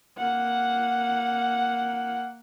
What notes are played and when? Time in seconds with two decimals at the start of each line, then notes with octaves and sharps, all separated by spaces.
0.18 A#3 F#5